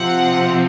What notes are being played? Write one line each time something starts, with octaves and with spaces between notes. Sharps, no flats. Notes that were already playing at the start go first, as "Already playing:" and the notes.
Already playing: C3 F3 C4 F#5